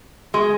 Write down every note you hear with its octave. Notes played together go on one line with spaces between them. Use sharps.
G#3 G#4